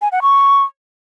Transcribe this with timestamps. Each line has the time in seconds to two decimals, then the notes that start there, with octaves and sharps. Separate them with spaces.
0.02 G#5
0.12 F#5
0.22 C#6